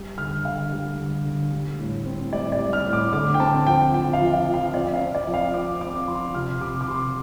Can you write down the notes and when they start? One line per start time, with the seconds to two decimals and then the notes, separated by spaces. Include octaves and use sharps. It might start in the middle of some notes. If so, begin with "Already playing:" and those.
Already playing: G3
0.18 D3 F6
0.45 D3 F5
0.72 G3
0.99 D3
1.25 D3
1.52 G3
1.79 A2
2.06 C4
2.33 G3 D5
2.52 D5
2.59 G3
2.73 F6
2.86 A2
2.93 D6
3.13 D3 D6
3.34 G5
3.40 C4 A5
3.66 F3 G5
3.94 F3 G5
4.13 F5
4.21 F3
4.33 F5
4.47 F3
4.54 F5
4.74 C4 D5
4.94 F5
5.00 C4
5.15 D5
5.27 F3
5.34 F5
5.54 C4 D6
5.81 C4 D6
6.08 F3 C6
6.35 C3 F6
6.61 C3 D6
6.81 D6
6.88 C3 C6